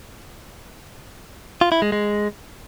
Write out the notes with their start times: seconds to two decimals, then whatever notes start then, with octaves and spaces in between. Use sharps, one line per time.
1.61 F4
1.72 E4
1.82 G#3
1.92 G#3